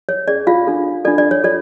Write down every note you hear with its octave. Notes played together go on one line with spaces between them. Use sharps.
C#5
C#4 G#4 C#5 D5
F4 F5
D4 F4 A4
D4 F4 A4 D5
D5
C#5
F4 A4 C#5 D5